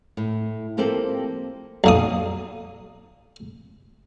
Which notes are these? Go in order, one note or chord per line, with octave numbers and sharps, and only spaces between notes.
A2
F3 A#3 C4 G4 A4
B1 A#2 D#6